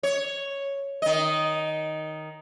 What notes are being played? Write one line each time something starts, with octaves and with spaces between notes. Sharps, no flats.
C#5
D#3 D#5